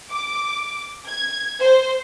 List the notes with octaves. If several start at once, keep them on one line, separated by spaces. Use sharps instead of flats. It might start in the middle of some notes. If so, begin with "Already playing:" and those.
D6
G#6
C5